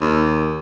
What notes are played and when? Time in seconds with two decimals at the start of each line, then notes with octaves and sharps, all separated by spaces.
0.01 D#2